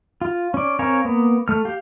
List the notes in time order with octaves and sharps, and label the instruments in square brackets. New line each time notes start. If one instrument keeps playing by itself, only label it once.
[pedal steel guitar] F4
C#4 D5
C4 A#4 C#5 F5 G#5
A#3 B3
A3 F6
G4 F5